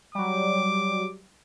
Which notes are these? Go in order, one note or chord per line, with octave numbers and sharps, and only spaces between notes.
F#3 G3 D6